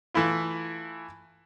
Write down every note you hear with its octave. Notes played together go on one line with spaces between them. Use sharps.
E3 A3 E4 F4